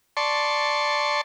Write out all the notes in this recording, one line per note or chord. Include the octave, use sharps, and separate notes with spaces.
D5 A5 C6 C#6